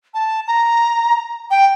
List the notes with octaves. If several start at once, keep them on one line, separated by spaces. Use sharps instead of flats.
A5
A#5
G5